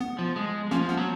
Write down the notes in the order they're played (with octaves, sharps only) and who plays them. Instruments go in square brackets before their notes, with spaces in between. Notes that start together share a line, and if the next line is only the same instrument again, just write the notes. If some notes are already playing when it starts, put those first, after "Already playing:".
[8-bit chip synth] B3
[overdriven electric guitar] F3
G#3
[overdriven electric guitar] F3 [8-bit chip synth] A#3 C#4
[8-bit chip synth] B3
[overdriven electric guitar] F#3